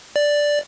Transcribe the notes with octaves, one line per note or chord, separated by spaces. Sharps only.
D5